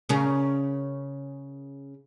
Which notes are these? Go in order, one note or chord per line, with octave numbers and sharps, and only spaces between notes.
C#3 C#4 A#4